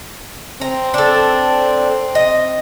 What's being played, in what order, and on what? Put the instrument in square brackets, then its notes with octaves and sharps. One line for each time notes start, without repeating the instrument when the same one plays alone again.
[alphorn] C4 [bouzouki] A#5
[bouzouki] D4 A4
D#5